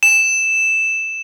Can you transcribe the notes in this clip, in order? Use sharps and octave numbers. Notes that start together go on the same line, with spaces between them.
E7